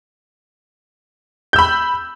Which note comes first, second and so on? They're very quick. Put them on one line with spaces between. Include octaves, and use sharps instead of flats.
G6 E6 B5